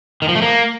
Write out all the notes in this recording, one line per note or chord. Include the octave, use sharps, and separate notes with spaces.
D#3
F3
A3
A#3